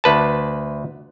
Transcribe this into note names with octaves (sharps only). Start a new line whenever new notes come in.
D2 B4 A5